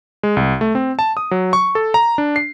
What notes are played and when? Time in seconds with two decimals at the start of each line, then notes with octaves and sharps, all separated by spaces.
0.23 G#3
0.37 C2
0.61 A3
0.75 C4
0.99 A5
1.17 D#6
1.31 F#3
1.53 C#6
1.75 A4
1.94 A#5
2.18 D4
2.36 C7